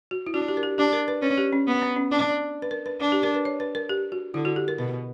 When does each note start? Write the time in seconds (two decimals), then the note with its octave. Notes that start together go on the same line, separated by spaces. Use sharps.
0.11 F#4
0.26 E4
0.34 D4 F#4
0.48 G4
0.57 A#4
0.63 G4
0.78 D4 G4
0.93 A#4
1.08 B4
1.22 C#4 B4
1.38 G4
1.53 C#4
1.67 B3
1.82 B3
1.96 C#4
2.11 D4
2.62 B4
2.71 A#4
2.86 B4
3.01 D4
3.12 G4
3.23 A#4
3.35 B4
3.45 C#5
3.60 B4
3.75 A#4
3.89 G4
4.12 F#4
4.34 D3 E4
4.45 F#4
4.56 G4
4.68 A#4
4.78 B2 B4